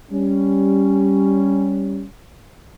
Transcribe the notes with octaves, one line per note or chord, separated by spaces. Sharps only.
G3 C#4